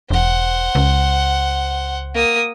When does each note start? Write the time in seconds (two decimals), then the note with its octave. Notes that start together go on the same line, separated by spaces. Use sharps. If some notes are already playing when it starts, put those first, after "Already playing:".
0.10 E1 C5 F#5
0.75 C#2
2.15 A#3 D#6